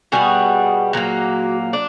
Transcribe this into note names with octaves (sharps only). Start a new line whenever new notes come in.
B2 G3 B3 F#4 G#4
A#2 F#3 A#3
D4